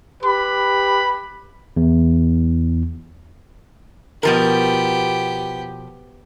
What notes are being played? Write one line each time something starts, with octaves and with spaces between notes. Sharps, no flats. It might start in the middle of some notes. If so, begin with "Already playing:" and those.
G4 B4 B5
E2
B2 F3 B3 G4 A#4